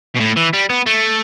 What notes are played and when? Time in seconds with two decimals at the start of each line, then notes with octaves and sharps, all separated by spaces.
0.16 B2
0.21 A2
0.37 E3
0.54 G3
0.70 B3
0.86 A3